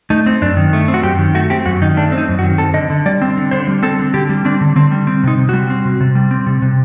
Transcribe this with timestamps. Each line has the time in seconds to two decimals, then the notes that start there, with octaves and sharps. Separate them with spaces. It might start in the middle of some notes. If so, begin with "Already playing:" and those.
0.10 A3 D#4
0.26 C4
0.41 F#2 D4
0.57 D#3
0.73 A3
0.88 C4
0.94 F#4
1.03 F#2 G4
1.19 D#3
1.34 A3 F#4
1.50 C4 G4
1.66 F#2 F#4
1.82 D#3 D#4
1.97 A3 D4
2.12 C4
2.18 D#4
2.28 F#2
2.39 F#4
2.44 D#3
2.58 C4 A4
2.74 D3 D#5
2.90 D3
3.06 G3 D5
3.22 C4
3.37 D3
3.51 D3 C5
3.68 G3
3.83 C4 A4
3.99 D3
4.14 D3 G4
4.29 G3
4.45 C4 D4
4.61 D3
4.76 D3 C4
4.91 G3
5.07 C4
5.23 C3 D#4
5.38 C3
5.49 G3 F#4
5.70 C4
5.85 C3
6.01 C3
6.15 G3
6.31 C4
6.46 C3
6.62 C3